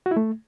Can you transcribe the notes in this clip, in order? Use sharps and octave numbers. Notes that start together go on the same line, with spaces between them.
F#4
E4
A3